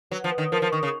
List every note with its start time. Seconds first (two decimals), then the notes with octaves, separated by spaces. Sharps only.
0.11 F#3 B4
0.24 F3
0.31 B4
0.38 D#3
0.52 F3 A#4
0.62 F3
0.72 D#3 C#6
0.83 C#3